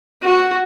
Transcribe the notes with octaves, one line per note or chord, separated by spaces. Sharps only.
F#4